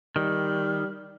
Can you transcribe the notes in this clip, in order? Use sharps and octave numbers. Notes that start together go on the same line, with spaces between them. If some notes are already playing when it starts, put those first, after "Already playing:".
D#3 G3